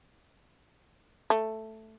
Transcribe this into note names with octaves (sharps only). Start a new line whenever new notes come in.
A3